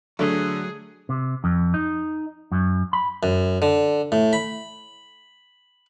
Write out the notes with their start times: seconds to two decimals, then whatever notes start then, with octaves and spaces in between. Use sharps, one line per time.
0.19 D3 F#3 A3 G#4
1.09 C3
1.44 F2
1.74 D#4
2.52 F#2
2.93 B5
3.23 F#2
3.62 D3
4.12 A2
4.33 B5